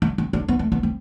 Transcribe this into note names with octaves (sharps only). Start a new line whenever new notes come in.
D4
C4
D4
B3
A3
B3
C4